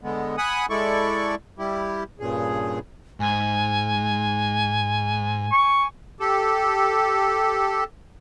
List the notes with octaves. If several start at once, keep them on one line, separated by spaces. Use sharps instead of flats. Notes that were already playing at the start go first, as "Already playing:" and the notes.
D3 G#3 B3
F#5 G#5 B5 D#6 F#6
G#3 E4 A4 D5 C#6
G3 E4 G4
G2 A#2 C#3 G#4
G#2 G#5
C#6
G4 A4